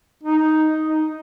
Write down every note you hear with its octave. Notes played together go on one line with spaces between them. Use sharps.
D#4
D#4